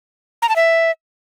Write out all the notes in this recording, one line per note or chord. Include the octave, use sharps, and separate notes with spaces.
A#5
A5
E5